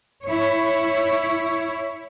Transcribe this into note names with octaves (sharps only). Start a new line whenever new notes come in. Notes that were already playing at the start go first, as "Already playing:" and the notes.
E4 C#5